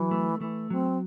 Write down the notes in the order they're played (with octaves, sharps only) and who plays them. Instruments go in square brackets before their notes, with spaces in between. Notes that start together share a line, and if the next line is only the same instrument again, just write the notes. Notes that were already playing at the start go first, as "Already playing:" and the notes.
Already playing: [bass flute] E3 [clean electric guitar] F#3
[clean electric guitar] A3
[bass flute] E3 [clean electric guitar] A3
[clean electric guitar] F#3 [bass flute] C4